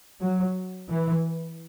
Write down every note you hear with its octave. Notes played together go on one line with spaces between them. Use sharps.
F#3
E3